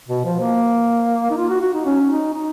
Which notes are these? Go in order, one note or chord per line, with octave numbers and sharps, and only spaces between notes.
B2
F3
A#3
D#4
F4
F#4
F#4
D#4
C#4
C#4
D#4
D#4